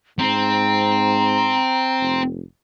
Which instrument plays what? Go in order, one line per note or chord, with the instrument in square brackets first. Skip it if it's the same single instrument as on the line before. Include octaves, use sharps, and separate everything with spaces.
[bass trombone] G#2 [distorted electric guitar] C4 [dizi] A#5
[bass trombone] F1